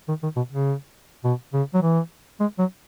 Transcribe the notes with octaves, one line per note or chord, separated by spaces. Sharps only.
D#3
D#3
B2
C#3
B2
C#3
F#3
E3
G#3
F#3